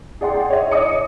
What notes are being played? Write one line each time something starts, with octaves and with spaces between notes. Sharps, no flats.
G#4 D5 F#5 G5 C6
C#5 D#5 E5
C#5 D#5 D6 D#6 C#7